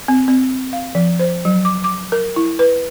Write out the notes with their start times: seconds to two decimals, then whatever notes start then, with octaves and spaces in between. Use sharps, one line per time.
0.08 C4
0.28 C4
0.73 F5
0.95 F3
1.19 C5
1.45 F#3
1.65 D6
1.84 D6
2.12 A#4
2.36 E4
2.59 B4